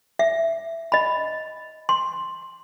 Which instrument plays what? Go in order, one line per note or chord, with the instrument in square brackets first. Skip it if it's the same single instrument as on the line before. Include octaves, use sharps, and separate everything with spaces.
[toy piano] E5
D#5 B5
C6